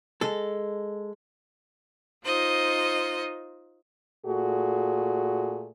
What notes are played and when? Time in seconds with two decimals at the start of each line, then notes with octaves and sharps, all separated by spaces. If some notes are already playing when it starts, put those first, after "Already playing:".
0.21 G#3 A4
2.25 D#4 F4 C5 D#5
4.26 A#2 A3 F#4 G#4